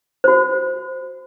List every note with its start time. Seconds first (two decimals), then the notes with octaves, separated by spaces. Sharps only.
0.24 F#4 C5